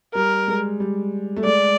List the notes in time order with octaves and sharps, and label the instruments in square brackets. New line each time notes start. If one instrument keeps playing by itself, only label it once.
[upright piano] G3 [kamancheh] A#4
[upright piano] G#3
G3
A3
[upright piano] G#3 [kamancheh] D5